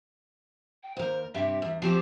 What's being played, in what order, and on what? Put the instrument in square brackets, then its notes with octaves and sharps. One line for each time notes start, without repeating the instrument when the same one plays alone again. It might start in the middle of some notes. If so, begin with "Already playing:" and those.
[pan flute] G5
[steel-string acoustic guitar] D#2 A#4 [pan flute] C5
[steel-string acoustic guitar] G2 C3 G4 [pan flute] E5
[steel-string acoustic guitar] E2
[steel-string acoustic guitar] F3 C4 C5 [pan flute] G4